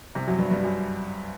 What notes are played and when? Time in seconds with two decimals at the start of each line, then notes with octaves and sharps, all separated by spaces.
0.15 C2 C3
0.27 F#2 F#3
0.39 G2 G3
0.51 G2 G3
0.63 F#2 F#3